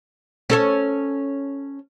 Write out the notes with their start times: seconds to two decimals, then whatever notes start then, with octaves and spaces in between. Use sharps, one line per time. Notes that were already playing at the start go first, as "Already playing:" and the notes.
0.50 C#4 A4 C#5